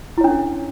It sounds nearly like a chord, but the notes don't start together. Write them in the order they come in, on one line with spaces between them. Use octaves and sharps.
E4 C#5 D4 C#4 A4